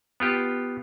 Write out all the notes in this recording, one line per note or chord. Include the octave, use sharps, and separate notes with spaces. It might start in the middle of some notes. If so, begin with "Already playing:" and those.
B3 F4 G4